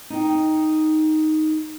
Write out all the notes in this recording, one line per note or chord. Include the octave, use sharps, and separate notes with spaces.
D#4 G5